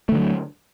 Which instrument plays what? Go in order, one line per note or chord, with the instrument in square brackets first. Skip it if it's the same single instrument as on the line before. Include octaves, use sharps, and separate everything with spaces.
[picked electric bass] A3
D3
F3
F#3